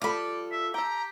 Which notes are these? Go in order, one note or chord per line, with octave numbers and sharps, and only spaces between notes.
F3 G3 F4 A4 D5 B5
E5
G4 A4 G5 A#5